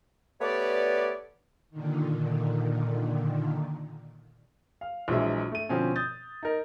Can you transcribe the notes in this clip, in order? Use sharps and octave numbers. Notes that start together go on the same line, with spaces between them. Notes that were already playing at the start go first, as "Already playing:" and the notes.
A3 B3 G4 B4 C#5 D5
A#2 D3 D#3
F5
A#1 E3 F#3 G#3 E5
A3 D#7
B2 D3 F3 C4 C#4
D#6 G6 A6
D#4 A#4